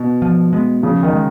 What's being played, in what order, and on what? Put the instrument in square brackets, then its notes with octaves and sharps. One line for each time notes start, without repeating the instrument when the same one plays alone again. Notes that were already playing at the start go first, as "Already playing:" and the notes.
Already playing: [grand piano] B2
[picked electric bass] F3
G#3 B3
[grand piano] C#3 [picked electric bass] F3
[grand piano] D#3
[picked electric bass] G#3